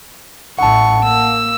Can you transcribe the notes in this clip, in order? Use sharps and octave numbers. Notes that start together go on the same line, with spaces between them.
A1 E4 F#5 A5 C#6
A#3 E6